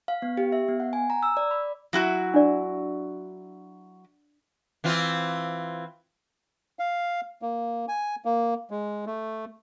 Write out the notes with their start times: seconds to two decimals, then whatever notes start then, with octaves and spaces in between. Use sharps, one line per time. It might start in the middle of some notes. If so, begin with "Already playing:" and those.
0.08 F5
0.22 B3
0.37 G4
0.52 E5
0.68 B3
0.80 F#5
0.93 G#5
1.10 A#5
1.23 E6
1.37 D5
1.51 B5
1.93 F#3 E4 F#4
2.34 D4 D5
4.84 E3 C4 F4
6.79 F5
7.42 A#3
7.88 G#5
8.25 A#3
8.71 G#3
9.06 A3